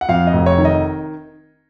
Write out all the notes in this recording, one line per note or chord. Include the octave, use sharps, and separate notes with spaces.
F#5
F2 F5
D#5
F1
C#5
D#3
D#5